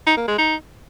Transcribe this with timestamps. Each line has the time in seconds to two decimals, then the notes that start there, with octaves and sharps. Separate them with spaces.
0.06 D#4
0.17 A#3
0.28 G#3
0.38 D#4